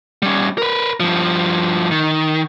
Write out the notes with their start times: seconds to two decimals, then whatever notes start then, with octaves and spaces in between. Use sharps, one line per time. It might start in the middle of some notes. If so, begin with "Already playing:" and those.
0.22 G3 C#4
0.58 A#4 B4
1.00 G2 F3
1.91 D#3